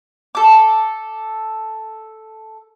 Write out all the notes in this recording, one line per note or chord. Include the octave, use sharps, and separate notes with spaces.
A4 D6